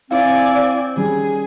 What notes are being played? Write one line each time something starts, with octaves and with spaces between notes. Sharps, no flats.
C4 E4 D5 F5 G#5
D#3 G3 C#4 G#4